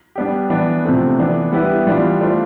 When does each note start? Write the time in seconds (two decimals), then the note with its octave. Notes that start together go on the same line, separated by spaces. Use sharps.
0.15 G3 B3 D4 G4
0.50 E3 B3 D4
0.84 C3 F3 A3 C4
1.18 E3 B3 D4
1.52 G3 B3 E4 G4 B4
1.86 E3 G3 B3 D4 F4
2.20 A3 D4 F4 C5